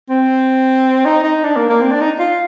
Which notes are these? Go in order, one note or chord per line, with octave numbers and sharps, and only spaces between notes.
C4
D#4
D#4
D4
A#3
A#3
C4
D4
D#4
F4